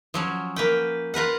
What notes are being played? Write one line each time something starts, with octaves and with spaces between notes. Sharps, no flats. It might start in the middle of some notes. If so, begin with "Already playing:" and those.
F3 F#3 C#4
A#3 B4 G5
F4 A#4 B4 F#5